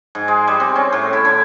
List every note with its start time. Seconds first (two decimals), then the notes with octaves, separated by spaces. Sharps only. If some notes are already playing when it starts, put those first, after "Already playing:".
0.15 G#2
0.28 G#3
0.47 G3
0.60 C4
0.75 C#4
0.92 A2
1.13 E4
1.25 D3